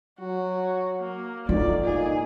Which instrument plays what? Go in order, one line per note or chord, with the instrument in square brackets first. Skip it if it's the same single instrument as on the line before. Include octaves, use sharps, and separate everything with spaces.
[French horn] F#3 [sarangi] F#4
[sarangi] A#3
[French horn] D2 [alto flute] D#4 [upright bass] F4 [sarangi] D5
[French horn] A#2 [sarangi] G#4